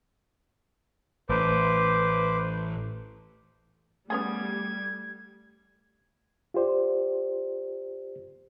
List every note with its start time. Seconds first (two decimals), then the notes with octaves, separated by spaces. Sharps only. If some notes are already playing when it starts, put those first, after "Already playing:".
1.30 A1 B4 C5 D6
4.10 G3 A3 B3 C#4 G#4 G#6
6.54 F4 G4 C5 D5